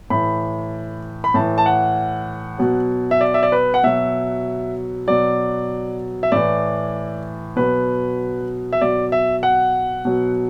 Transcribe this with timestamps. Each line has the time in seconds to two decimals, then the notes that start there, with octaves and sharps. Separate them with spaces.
0.10 A2 E3 B5
1.24 B5
1.34 A2 E3 A5
1.58 A5
1.66 F#5
2.59 B2 F#3
3.11 E5
3.21 D5
3.34 E5
3.43 D5
3.52 B4
3.74 F#5
3.83 B2 F#3 E5
5.07 B2 F#3 D5
6.23 E5
6.32 A2 E3 D5
7.56 B2 F#3 B4
8.73 E5
8.81 B2 F#3 D5
9.12 E5
9.43 F#5
10.05 B2 F#3